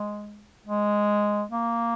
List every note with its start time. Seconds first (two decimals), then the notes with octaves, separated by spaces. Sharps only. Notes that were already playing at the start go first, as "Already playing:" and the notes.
Already playing: G#3
0.66 G#3
1.51 A#3